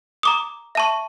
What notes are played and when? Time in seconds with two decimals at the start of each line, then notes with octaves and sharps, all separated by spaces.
0.23 A#5 D6 D#6
0.75 E5 A5 C#6